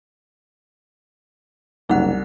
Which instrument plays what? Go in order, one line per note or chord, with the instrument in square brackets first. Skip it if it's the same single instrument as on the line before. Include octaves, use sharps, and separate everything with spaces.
[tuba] F#1 [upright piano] C2 [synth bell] D#4 F#5 F#6